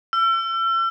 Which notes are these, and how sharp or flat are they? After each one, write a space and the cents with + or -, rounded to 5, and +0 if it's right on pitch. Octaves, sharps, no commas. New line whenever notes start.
E6 +40